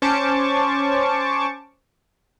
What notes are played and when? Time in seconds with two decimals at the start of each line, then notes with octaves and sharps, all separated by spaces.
0.02 C#4 C5 A5 C#6 D6